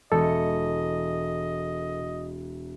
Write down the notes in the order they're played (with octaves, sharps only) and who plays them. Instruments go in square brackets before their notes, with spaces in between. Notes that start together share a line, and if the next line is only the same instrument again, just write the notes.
[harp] E1 C#7 [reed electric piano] A4 [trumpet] D#5